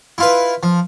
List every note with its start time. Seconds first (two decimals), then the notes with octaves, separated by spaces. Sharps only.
0.18 E4 F4 B4
0.63 F3